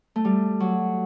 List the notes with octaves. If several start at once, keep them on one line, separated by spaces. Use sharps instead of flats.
A3
G3
F#3